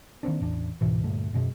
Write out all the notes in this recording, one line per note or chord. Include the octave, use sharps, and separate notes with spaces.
D#3 A#3 C4 D4
A1 E2 D4
C#2 G#2 B2 E3
D2 G2 A#2 A3
D#1 F#2 B2 G#3